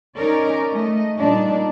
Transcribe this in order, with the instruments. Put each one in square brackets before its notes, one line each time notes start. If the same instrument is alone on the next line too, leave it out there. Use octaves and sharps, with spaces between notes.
[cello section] C#4 D#4 A#4 C#5 D5
A3 D#5
A#2 G3 D4 D#4